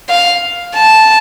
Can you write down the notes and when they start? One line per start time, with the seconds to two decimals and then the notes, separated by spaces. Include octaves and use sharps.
0.09 F5
0.75 A5